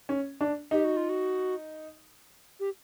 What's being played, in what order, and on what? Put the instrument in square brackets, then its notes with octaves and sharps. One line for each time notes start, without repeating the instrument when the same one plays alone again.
[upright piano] C#4
D4
[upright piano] D#4 [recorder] G4
[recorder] F#4
F4
F#4
G4